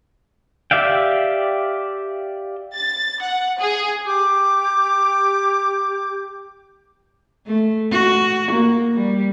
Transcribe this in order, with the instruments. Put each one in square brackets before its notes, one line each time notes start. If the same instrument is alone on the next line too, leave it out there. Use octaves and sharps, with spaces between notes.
[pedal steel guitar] G4 D5 E5 F5 G5
[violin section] A6
F#5
G#4
[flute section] G4 D6 G6
[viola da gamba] A3
F#4
A#3
G3